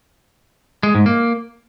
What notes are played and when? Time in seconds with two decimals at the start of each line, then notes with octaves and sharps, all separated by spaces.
0.83 G#3
0.95 G#2
1.06 A#3